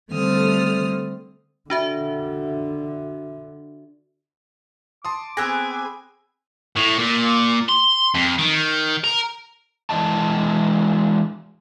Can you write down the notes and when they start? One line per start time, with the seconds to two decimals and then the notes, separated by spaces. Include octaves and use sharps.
0.12 D3 G3 A3 C4 D#6 F6
1.70 D3 D4 F#4 E5
5.05 A5 C6 D6 D#6
5.37 B3 C4 G#4 G#5 E6 F#6 A#6
6.77 A2
6.99 A#2
7.69 C6
8.14 F2
8.39 D#3
9.04 A#4
9.90 E3 G#3 D4 D#5 A5